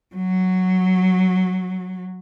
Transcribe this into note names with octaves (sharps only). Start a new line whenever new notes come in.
F#3